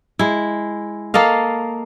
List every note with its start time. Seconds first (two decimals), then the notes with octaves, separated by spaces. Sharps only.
0.19 G#3 E4
1.14 A#3 A4 D#5 F5